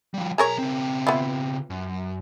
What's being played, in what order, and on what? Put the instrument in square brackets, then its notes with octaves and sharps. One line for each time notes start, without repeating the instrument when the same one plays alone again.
[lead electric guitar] F3 G3
[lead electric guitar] B1 A#5 [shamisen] G#4 A#4 C#5
[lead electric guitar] C#3 C4
[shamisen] B3 E4 F4
[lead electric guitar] F#2